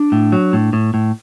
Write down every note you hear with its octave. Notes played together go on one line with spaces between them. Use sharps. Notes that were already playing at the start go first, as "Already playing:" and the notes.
Already playing: D4
A2
F#3
A2
A2
A2